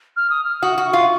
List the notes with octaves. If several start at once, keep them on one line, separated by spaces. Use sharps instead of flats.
F6
D#6
F6
F#4 D#6
F#4
C#6
F4